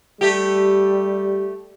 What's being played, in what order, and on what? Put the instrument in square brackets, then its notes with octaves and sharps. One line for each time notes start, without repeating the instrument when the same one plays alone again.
[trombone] G3 [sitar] A3 G4